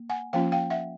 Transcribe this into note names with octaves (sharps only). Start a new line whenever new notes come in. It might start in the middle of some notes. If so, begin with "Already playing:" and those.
Already playing: A#3
F#5 G#5
F3 A#3 C#4 F4 F5 G5
F5 G5
E5 F#5